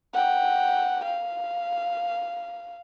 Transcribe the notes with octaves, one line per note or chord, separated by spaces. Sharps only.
F#5 G5
F5